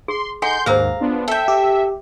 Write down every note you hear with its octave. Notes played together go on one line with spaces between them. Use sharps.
G#4 C6
D#4 A4 F#5 G#5 C6 G6
D#2 G#2 G#4 A#4 C5 F5 A#5
B3 D4 F4
A4 E5 G5
G4